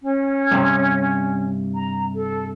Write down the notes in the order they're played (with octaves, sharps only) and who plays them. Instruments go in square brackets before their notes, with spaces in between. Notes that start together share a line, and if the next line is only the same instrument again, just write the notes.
[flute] C#4
[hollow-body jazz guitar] G2 C3
[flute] A#5
A4